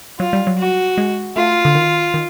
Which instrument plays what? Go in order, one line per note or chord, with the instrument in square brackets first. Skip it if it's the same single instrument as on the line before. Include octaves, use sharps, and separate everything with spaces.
[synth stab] F#3 [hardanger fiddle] F4
[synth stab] G3
F#3
[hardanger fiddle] F#4
[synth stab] G#3
[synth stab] A3 [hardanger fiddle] F4
[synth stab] D3
D#3
D#3